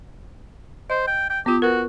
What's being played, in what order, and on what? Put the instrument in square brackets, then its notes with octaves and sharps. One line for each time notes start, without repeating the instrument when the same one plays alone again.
[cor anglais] C5 [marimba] D#5
[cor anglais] G5
G5
[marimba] B3 F4 [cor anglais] G4
[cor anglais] F#4 [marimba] A#4 B4